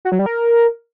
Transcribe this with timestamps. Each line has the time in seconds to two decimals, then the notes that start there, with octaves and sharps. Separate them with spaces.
0.05 F#4
0.12 F#3
0.19 G3
0.26 A#4